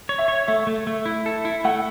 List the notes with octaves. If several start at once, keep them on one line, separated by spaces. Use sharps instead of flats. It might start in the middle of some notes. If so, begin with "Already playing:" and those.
C#5
E5
C#5
A3 E5
A3
A3
E4
A4
E4
A3 F#5